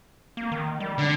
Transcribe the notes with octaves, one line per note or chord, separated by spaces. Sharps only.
A#3
D#3
G3
D3